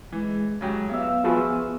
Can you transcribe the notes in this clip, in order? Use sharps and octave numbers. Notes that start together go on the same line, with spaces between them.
E3 G#3
C#3 F#3 G#3 G4
B3 E5 F5
F3 F4 F#4 G#4 B4